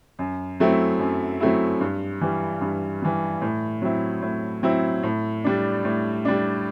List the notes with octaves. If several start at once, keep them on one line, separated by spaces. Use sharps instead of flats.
F#2
F#3 A3 C4 E4
F#2
F#3 A3 C4 E4
G2
E3 G3
G2
E3 G3
A2
F#3 C4 E4
A2
F#3 C4 E4
A2
G3 D4
A2
G3 D4